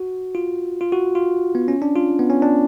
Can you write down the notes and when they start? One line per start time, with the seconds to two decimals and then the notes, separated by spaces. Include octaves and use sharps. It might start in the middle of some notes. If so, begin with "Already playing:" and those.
Already playing: F#4
0.35 F4
0.81 F4
0.92 F#4
1.15 F4
1.55 B3
1.68 C#4
1.82 D4
1.96 F4
2.19 B3
2.30 C#4
2.42 D4